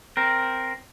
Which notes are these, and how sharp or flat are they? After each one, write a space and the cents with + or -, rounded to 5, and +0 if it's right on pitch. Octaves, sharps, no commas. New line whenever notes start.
C4 +0 A#4 +0